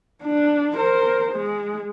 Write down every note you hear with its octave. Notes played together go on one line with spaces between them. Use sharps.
D4
A#4 C5
G#3